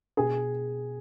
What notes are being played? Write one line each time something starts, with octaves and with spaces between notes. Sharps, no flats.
B2 G#4 G#5